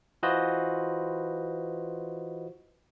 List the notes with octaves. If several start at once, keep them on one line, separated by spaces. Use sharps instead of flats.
E3 F4 F#4 B4 C5 D#5